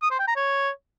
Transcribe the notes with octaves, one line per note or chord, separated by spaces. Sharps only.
D#6
C5
G5
A#5
C#5